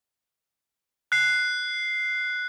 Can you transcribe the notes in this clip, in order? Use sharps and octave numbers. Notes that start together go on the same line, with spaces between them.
F#6 C7